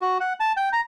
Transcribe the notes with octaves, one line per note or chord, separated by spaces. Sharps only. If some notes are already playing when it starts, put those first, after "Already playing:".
F#4
F#5
A5
G5
A#5